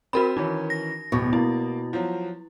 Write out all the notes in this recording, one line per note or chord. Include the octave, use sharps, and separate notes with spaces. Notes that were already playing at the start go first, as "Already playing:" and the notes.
C4 F#4 A#4 B5
D#3 E3 C#4 D#4
A#6
D1 B2 C#6
A#3 E4
F3 F#3